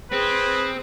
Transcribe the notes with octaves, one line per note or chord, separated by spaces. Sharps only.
C4 G#4 B4